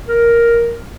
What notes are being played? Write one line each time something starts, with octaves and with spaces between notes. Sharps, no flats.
A#4